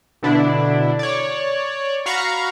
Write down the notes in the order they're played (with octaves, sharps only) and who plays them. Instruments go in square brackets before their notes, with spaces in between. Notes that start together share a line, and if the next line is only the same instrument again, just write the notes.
[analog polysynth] B2 D3 D4 E4
C#5 D5
F#4 F5 A#5 B5 C#6